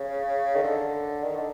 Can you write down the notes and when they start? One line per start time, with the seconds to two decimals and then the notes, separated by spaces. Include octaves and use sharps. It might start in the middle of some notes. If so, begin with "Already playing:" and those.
Already playing: C#3
0.55 D#3
0.63 D3
1.24 D#3
1.35 D3